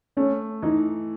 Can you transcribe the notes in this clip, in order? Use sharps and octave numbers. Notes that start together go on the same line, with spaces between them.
A3 C#4
E3 D#4